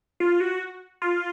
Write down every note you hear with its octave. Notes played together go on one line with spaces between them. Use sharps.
F4
F#4
F4